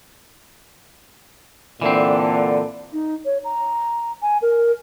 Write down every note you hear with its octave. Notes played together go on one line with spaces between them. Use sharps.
A#2 D3 E3 C4
D#4
C#5
A#5
G#5
A#4